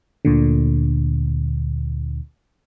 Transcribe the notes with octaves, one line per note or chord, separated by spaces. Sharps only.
D2 A#2 D3